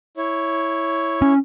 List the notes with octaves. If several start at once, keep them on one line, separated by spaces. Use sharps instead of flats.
E4 C#5
C#4